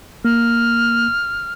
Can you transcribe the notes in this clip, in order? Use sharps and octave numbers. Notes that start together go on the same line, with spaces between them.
A#3 F6